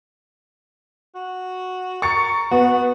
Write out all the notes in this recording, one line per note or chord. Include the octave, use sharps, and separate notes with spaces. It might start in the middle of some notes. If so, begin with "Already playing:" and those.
F#4
A#4 C#6 A6 C#7
B3 F#4